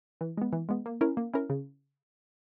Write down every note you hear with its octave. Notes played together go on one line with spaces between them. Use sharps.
E3
G#3 B3
E3
G#3 B3
A#3
C#4 E4 A#4
A#3
C#4 E4 A#4
C#3